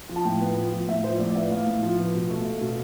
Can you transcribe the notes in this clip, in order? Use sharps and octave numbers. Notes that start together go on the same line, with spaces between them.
F3
A5
A2 G5
B3
F3
F3
A2 E5
F3 C5
A2 D5
D5
B3 E5
A2 F5
A2
F3
B3
B2
A3
A3
B2